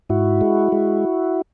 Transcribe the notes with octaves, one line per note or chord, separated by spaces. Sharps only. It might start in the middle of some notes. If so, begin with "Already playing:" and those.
G#2 E4 F#4
G#3
G#3